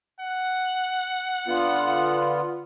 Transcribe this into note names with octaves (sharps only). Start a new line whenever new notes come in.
F#5
D3 B3 F4